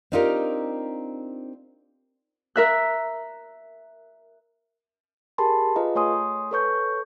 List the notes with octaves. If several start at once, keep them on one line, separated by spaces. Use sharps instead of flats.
C4 D4 D#4 F4 G4 A#4
A#4 E5 F#6
G4 G#4 A#4 A5 B5 C6
F4 G#4 B4 D#5 F5 A#5
A3 C#5 G#5 C6 D#6
A4 B4 C#5 C#6 G6